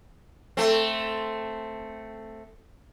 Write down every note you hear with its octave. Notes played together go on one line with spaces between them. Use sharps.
A3 C4